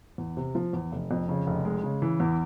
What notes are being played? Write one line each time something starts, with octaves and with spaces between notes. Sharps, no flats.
E2
C3
F3
E2
F1
F2
C#3
F1
G#3
C#3
E3
E2